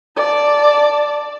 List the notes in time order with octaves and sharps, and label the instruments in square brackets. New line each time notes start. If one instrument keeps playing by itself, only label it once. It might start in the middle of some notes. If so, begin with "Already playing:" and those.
[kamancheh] D5 A5